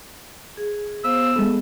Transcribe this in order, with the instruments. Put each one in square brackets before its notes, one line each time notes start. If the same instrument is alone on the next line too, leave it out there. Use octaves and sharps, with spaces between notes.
[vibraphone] G#4
[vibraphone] B3 C5 F5 [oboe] E6
[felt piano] G#3 A4 [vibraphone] B3